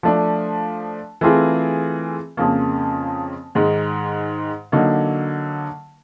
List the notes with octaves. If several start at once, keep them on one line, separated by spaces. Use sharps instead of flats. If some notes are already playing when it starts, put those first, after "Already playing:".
F3 A3 D4
E3 A3 C4 F4 G#4
F2 C#3 F3 A#3
G#2 D#3 G#3
D3 F#3 A#3 D#4